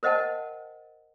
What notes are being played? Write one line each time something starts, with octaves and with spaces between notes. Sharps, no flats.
A#4 C5 D#5 F#5 G5 A5